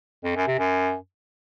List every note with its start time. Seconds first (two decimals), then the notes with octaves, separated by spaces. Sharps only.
0.24 F2
0.36 F#2
0.47 C3
0.59 F#2